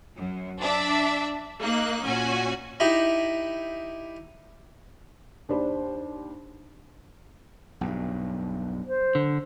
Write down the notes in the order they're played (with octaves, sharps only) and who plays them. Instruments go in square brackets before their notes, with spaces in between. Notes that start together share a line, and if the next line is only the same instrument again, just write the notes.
[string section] F#2
D4 E5
A#3 D#4 F#6
A#2 C#4 F#4 G#5
[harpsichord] D#4 E4 G4 E5 A#5
[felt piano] D#2 D4 G4 C5 D5 B5
[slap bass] B1 G2
[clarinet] C5
[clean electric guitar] D3